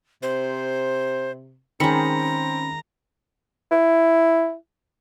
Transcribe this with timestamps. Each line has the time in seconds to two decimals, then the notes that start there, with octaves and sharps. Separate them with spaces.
0.23 C3 C5
1.80 D#3 G#3 C4 C#4 A#5 B5 C#7
3.71 E4